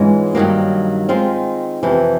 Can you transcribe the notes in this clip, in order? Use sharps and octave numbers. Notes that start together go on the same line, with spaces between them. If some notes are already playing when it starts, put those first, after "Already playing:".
Already playing: G#2 E3 G#3 C#4 F4
G2 D#3 F#3 A#3
D#3 G#3 C4 F4
F2 C3 E3